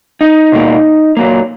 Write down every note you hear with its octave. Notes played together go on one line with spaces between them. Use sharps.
D#4
B2 A#3
A#2 F#3 A#3